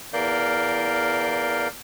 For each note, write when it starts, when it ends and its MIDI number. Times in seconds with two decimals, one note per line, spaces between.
0.13 1.68 40
0.13 1.68 52
0.13 1.68 70
0.13 1.68 74
0.13 1.68 77
0.13 1.68 91